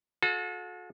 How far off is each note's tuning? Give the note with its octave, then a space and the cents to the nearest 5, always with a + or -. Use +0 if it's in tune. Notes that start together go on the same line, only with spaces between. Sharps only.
F#4 -45 A4 -30